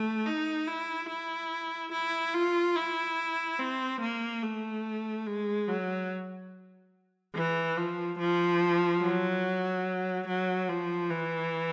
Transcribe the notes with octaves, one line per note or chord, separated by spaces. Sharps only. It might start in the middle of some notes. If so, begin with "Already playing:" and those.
Already playing: A3
D#4
E4
E4
E4
F4
E4
C4
A#3
A3
G#3
F#3
E3
F3
F3
F#3
F#3
F3
E3